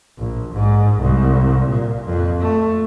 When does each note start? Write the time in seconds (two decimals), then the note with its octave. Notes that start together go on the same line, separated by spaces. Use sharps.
0.18 A#1
0.53 G#2
1.01 C2
1.68 A#2
2.05 F2
2.40 A3